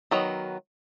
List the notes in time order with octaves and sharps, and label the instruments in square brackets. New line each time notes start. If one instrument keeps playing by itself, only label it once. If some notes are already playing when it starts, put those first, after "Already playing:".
[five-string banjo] D#3 F#3 B3